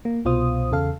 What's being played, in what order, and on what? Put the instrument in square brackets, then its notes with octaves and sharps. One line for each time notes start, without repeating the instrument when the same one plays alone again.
[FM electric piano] A#3
C2 B2 F4 C5 D#6
E2 C#3 A4 F5